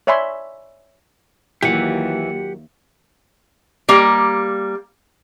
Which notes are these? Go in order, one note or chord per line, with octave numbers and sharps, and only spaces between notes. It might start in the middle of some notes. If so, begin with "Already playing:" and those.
C#5 D5 E5 G#5 B5 C6
D#2 E3 F#3 A#3 F4 G4 F#5
G3 A#3 A#5